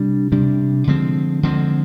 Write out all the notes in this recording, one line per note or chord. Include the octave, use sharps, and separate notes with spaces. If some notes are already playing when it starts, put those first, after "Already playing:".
Already playing: C3 G3 D4
C3 G3 D4
D3 F3 G#3 C4
D3 F3 G#3 C4